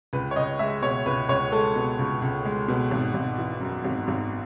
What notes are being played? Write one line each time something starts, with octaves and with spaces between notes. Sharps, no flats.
C#2 B4
C#5
C#2 D#5
G#3 E5
B2 C#5
C#2 B4
C#2 C#5
G#3 A4
B2
C#2
C#2
G#3
B2
G#1
G#1
E3
F#2
G#1
G#1